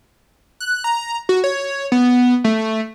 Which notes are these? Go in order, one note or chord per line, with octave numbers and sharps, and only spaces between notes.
F#6
A#5
F#4
C#5
B3
A3